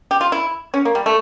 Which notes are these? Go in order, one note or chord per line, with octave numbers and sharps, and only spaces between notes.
G4
F4
E4
C#4
A#3
G3
A3